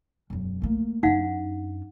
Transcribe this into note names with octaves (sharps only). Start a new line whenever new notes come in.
E1 F#2
A3 A#3
F#2 D4 D#4 F5 F#5